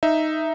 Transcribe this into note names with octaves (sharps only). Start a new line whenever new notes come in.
D#4 E5